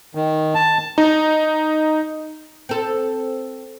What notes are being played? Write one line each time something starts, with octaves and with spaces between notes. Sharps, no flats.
D#3
A5
D#4
C4 A4